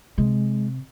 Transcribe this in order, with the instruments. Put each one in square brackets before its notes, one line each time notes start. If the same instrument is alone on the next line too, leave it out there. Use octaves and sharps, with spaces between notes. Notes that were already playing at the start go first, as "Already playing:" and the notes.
[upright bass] C3 [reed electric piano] G#3